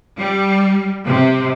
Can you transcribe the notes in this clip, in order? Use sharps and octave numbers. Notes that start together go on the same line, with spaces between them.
G3
C3